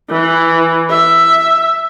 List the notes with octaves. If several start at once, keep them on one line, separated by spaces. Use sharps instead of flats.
E3
E5